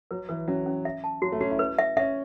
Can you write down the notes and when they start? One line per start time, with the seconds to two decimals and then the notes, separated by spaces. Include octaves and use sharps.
0.11 F#3 B4
0.29 E3 B4
0.48 F#3 C#4
0.66 C#4
0.85 E5
1.04 A5
1.22 F#3 F#4
1.32 A3
1.40 C#4 F#4
1.51 E4
1.59 B4
1.79 E5
1.97 C#4 E5